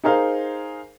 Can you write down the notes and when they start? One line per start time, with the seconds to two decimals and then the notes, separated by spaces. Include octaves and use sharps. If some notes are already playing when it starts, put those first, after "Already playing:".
0.04 D#4 G#4 A#4 C5 F5